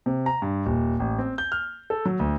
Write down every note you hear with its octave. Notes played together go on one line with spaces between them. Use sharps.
C3
A#5
G2
D#1
A1
C4
G6
F6
A4
F#3
D2